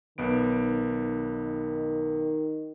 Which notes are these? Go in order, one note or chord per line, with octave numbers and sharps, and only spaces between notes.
B1 D#3 B3 D7